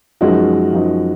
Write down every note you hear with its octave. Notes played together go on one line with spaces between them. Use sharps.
F#2 F3 G#3 D#4 F#4
F#2 F3 G#3 D#4 F#4